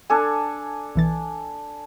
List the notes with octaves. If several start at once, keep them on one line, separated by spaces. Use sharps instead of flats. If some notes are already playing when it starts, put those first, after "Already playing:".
D4 A4 G#5
B1 E3 A6